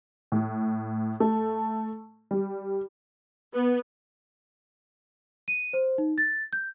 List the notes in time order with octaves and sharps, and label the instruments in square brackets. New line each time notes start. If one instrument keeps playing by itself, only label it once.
[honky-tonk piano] A2
A3
G3
[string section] B3
[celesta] D#7
C5
D#4
A6
G6